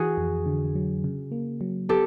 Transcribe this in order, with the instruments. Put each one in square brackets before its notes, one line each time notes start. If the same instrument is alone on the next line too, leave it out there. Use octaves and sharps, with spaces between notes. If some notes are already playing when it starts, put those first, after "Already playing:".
Already playing: [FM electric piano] E3 [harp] F#4 G#4
[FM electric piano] F2
D3
F#3
C#3
A#3
F#3
[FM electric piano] B3 [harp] G4 A4